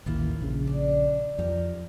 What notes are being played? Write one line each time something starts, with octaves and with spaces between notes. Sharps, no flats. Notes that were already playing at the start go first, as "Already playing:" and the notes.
A1 D#2 E3 A#3 E4 F4
A#1 C#3
D4
F2 G4 A#4